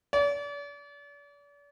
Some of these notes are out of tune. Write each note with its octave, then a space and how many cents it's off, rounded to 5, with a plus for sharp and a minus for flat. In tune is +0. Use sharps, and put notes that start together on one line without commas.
D5 -40